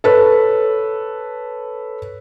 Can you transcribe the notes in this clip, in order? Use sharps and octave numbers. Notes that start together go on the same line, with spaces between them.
A4 B4 C#5